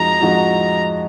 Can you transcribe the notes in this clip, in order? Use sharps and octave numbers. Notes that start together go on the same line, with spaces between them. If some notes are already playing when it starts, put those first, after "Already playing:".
Already playing: F2 F3 G#3 D#4 F#4 A#5
F2 F3 G#3 D#4 F#4